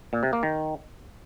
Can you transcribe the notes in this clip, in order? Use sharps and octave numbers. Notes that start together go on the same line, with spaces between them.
A#2
C3
A#3
D#3